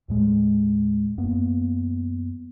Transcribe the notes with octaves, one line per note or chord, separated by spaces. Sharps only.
D#2 A2 G#3
F#2 A#3 B3